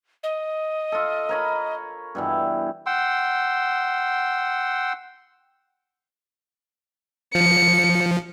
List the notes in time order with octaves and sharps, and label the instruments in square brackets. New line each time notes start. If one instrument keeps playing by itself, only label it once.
[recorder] D#5
[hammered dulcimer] F4 A4
A#4 C#5 B5
G2 B2 E3
[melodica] F#5 G5 C6 E6
[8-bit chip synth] F3 [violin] C#7